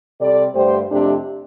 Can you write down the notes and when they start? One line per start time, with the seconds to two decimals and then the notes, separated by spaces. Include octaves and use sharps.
0.20 C3 G3 A4 D5
0.55 G2 D3 A3 G4 C5
0.90 F2 C3 A3 D4 G4